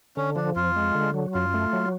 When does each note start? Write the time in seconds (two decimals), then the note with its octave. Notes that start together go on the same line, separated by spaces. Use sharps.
0.17 D3 C#4
0.36 F3 D4
0.56 F2 F4
0.76 G#3
0.95 D3
1.14 F#3
1.34 F#2 F4
1.54 A3
1.73 F#3